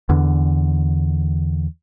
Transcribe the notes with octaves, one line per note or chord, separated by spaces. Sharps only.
E2 D3